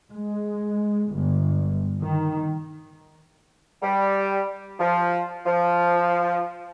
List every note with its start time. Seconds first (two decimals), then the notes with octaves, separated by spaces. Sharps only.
0.13 G#3
1.14 G1
2.02 D#3
3.82 G3
4.79 F3
5.46 F3